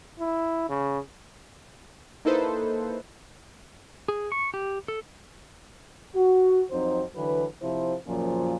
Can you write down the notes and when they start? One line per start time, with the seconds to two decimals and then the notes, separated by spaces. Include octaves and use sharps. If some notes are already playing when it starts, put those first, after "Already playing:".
0.20 E4
0.69 C#3
2.25 A#3 D#4 E4 A4 B4 C5
4.08 G#4
4.32 C#6
4.54 G4
4.88 A4
6.14 F#4
6.70 F2 F#3 C4 D#4 C5
7.15 D3 E3 F#3 B4
7.61 C3 F3 E4 C5
8.06 F#2 A#2 C#3 F3